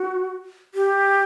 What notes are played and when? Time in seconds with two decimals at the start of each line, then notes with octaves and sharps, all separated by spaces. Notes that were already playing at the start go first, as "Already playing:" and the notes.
Already playing: F#4
0.75 G4